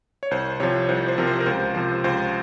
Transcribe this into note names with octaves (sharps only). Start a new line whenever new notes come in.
C#5
C2 C5
C3 F3 C#5
C2 C5
C5
C3 F3 A#4
C5
A#4
C#2 C5
C3 F3 C5
C#2 C5